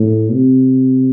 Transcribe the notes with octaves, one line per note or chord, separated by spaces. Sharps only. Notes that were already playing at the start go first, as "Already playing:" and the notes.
Already playing: A2
C3